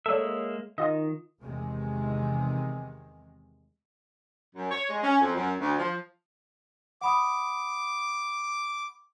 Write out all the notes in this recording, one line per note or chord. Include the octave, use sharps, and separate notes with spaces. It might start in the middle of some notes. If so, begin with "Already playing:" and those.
G#3 A#3 A4 C#5 E5
D#3 F4 D#5
E2 C3 D#3 G#3
F#2
C#5
G#3
C#4
F2
F#2
D2
F3
F#5 B5 D6 D#6